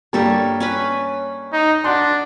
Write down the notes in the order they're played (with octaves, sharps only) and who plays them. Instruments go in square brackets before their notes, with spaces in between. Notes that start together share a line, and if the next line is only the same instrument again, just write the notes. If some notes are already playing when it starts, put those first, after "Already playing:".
[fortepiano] G2 A#3 [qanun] G3 A4 C#5
[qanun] C#4 B4 B5
[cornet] D#4
[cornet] D4 [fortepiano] F#5 C6